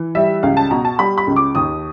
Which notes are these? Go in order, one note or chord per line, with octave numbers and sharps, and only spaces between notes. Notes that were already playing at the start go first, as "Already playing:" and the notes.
Already playing: E3
G3 E5
C#2 F5
A5
B2 A#5
A5
G3 B5
B5
C#2
D6
D#2 D#6